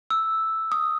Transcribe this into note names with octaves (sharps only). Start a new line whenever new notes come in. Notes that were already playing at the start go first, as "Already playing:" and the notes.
E6
D#6